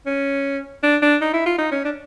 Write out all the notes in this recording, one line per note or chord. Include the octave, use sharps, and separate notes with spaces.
C#4
D4
D4
D#4
E4
F4
D#4
C#4
D4